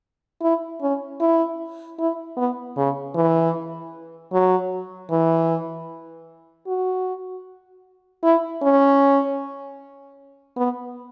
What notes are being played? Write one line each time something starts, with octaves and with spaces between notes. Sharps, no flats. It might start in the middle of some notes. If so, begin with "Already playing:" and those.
E4
C#4
E4
E4
B3
C#3
E3
F#3
E3
F#4
E4
C#4
B3